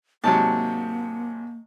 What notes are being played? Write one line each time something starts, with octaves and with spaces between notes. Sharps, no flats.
G#2 C3 F#3 A#3 A5